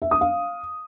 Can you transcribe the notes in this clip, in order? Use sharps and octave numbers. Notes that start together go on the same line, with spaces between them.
E5
D#6
F5